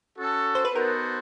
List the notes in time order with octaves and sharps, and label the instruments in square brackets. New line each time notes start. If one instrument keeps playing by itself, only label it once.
[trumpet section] C#4 F#4 A4
[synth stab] C5
B4
[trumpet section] B3 D#4 F#4 A4 C5 [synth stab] A#4